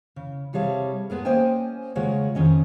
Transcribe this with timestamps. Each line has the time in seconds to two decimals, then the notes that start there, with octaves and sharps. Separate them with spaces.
0.16 C#3
0.53 C3 G3 G#4 C#5 F5 A5
1.10 G#3 B3 G#4 A#4
1.25 A#3 C#4 C5 D#5 G5 G#5
1.95 C#3 G#3 F4 C#5 F#5
2.35 F2 D#3 C#4 D#5